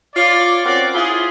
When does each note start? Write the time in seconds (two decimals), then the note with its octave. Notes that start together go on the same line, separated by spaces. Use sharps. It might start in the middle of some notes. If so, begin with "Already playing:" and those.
0.15 F4 C#5 D5
0.65 C4 C#4 F#4 A#4 D5
0.94 E4 F4 G#4